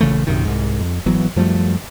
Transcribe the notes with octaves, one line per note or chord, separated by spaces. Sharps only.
A#1 C#3 E3 A3
A#1 F#2 C3 D#3
C2 G#2
F2
G#1 E3 F#3 B3
F#2 F3 G3 A3